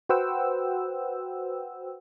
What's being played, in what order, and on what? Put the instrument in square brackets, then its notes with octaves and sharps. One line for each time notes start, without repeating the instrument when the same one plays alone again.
[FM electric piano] F#4 B4 C5 F#5 G5 E6